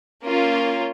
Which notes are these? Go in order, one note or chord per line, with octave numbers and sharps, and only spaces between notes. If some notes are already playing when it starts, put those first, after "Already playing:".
A#3 C#4 F4